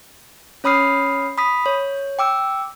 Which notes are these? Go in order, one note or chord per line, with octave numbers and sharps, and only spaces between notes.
C#4 C#5 B5 D#6 F6 C7
B5 D#6 B6
C#5
G5 D6 E6